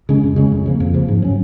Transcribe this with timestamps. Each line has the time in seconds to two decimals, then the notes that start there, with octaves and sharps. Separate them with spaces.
0.09 C#3 G#3 C#4
0.23 F2
0.36 C#3 G#3 C#4
0.52 F2
0.66 C#3 F3 A#3
0.80 F2
0.94 C#3 F3 A#3
1.08 G#2
1.22 F#3 C#4